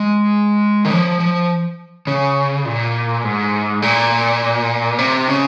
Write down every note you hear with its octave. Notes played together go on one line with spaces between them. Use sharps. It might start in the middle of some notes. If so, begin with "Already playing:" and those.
Already playing: G#3
D#3
F3
F3
C#3
A#2
G#2
A#2
C3
C#3